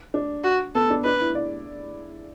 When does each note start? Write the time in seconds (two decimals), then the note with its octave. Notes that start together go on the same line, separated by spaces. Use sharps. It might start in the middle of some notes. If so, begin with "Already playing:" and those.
0.14 D4
0.44 F#4
0.75 B3 A4
0.90 D4
1.04 D4 B4
1.21 E4
1.35 D5